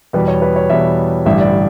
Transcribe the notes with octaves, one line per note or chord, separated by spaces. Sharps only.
E2 B2 G3 B4
C#5
B4
C#5
E2 B2 G3 E5
A1 G2 D3 G3 E5
D5